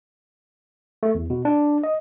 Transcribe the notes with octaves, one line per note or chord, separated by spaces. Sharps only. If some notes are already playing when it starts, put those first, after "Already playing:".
A3
E2
B2
D4
D#5